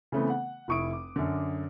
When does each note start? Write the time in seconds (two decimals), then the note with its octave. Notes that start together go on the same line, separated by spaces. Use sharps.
0.12 C#3 E3 A3 B3 C4
0.30 F#5
0.68 F1 E4 C#6 D#6 D7
0.93 D6
1.16 F#2 D3